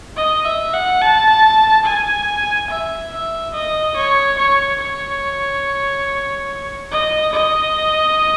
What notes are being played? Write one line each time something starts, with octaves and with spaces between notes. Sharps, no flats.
D#5
E5
F#5
A5
G#5
E5
E5
D#5
C#5
C#5
C#5
D#5
D#5